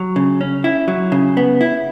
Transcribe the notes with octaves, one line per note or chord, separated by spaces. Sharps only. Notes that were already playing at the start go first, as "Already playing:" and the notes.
Already playing: F#3
C#3
C#4
E4
F#3
C#3
B3
E4